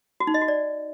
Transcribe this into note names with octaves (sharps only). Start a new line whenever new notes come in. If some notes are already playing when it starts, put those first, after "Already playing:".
F#4
D#4
D#5
F#4
D5